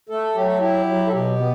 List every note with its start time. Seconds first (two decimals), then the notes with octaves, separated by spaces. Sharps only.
0.09 A3 A4
0.35 F#3 G4
0.47 A4
0.58 E4 G4
0.86 F#3
1.07 A4
1.12 B2 G4
1.38 B3